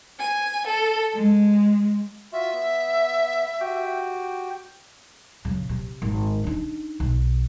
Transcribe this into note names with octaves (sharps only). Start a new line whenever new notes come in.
G#5
A4
G#3
F4 F#4 E5
B3
F#4 G4 G5
C#3 F#3
C3
G#1
D4 D#4
B1